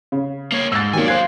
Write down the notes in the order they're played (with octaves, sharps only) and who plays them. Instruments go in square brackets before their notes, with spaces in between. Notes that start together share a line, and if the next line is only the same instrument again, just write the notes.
[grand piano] C#3
[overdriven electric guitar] A#3 C#5
[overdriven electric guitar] G#2 [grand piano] E6 A6
[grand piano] D#3 F#3 A#3 [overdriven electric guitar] D5 G#5
[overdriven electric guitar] F#3 F5 [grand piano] C5 F#6 G#6